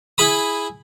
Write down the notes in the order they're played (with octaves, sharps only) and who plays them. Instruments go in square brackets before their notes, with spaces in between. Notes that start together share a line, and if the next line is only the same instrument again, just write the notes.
[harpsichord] E4 G#4 B5 D#6